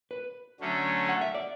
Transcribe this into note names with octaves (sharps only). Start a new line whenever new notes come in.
B4
D3 F#3 A3 C#4
F#5
E5
D5